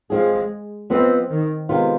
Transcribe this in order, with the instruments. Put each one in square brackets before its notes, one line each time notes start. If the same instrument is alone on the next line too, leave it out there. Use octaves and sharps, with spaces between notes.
[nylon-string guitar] F3 C4 F4 G#4 [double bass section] G#3
[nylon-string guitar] F3 B3 F4 B4 D#5 [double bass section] C4
[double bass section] D#3
[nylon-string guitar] C3 D#3 G#3 B3 F4